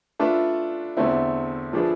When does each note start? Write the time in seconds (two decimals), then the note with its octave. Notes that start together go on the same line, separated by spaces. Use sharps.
0.19 A3 D4 F4 B4 E5
0.97 E2 D3 A3 C4 E4
1.73 F3 A3 D4 G#4 B4